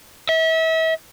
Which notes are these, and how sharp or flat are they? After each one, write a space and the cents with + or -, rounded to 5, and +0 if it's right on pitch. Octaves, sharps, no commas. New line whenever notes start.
E5 -35